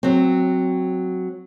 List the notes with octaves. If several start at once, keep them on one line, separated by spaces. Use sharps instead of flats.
F#3 C4